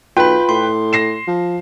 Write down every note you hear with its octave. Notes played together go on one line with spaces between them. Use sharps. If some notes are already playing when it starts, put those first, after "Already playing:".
B1 F4 B4 G5 B5
A2 C6
A#6 C7 E7
F3